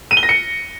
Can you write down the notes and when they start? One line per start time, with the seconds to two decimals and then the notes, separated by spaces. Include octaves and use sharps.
0.11 D#7
0.17 G7
0.23 A#6
0.29 C#7